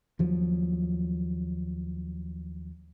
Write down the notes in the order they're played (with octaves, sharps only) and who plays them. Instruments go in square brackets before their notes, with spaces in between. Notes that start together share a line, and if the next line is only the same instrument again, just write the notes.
[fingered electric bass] D#2 F3 F#3